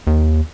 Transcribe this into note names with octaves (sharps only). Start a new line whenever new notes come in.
D#2